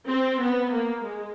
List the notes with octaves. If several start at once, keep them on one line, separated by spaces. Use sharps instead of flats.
C4
B3
A#3
G#3